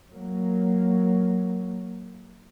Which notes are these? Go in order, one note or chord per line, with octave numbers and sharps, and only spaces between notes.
F#3 A#3